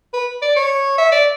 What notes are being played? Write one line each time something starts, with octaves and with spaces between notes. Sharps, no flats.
B4
D5
C#5
E5
D5